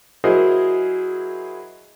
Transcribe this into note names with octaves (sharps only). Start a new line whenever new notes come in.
F#3 E4 G#4 A#4 C5 D#5